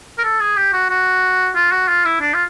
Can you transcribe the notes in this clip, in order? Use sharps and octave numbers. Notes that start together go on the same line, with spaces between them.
A#4
A4
G#4
G4
F#4
F#4
F4
F#4
F4
E4
D4
F4